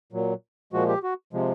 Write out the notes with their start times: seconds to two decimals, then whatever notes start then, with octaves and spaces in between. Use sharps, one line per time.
0.13 A#2 F#3
0.73 A#2 F3 G#3 F#4
0.88 G4
1.03 F#4
1.33 C3 F3 G#3